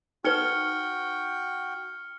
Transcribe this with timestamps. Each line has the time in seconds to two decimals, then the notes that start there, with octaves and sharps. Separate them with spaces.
0.25 D#4 F#4 B4 G5 F6 C#7 G7